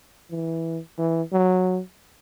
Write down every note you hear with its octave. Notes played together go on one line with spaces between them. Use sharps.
E3
E3
F#3